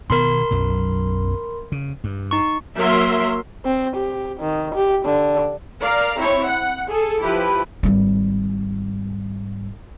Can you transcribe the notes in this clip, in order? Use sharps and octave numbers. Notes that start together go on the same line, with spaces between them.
B2 D#3 B3 A#4 B5 C6
B1 F#2 F#3
C#3
G2
D#4 C#6
F#3 A#3 A#4 E5 C6
C4
G4
D#3
G4
D3
A#4 D5 F5 A#5
C4 E4 C#5
F#5
G#4 A4
F3 E4 G4 B4
G#1 G3